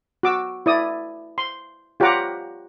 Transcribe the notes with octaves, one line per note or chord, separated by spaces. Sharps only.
F#4 D6 E6
E4 D5 D#6
C6
F4 G4 C#5 F#5 A#5 D6